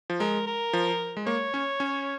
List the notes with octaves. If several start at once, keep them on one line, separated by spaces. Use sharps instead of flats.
F3
G#3 A#4
A#4
F3
G#3
A#3 C#5
C#4
C#4